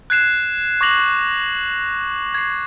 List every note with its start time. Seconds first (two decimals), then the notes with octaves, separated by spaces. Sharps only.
0.10 F#6 G#6 C7 E7
0.81 C#6 D6 G#6 A#6 F7 F#7
2.34 G#6 C7